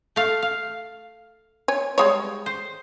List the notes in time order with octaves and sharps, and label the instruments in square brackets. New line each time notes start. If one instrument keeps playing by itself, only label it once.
[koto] A3 F5
F5
[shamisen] C#5 G#5
G3 G#3 C#5
[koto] C5